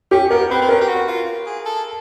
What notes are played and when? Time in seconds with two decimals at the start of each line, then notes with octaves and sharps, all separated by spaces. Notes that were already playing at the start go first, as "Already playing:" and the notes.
0.11 C#4 G4
0.30 B3 A#4
0.50 C4 B4
0.61 C4
0.69 C#4 A#4
0.81 G4
0.88 F#4
1.08 F4
1.46 G#4
1.65 A4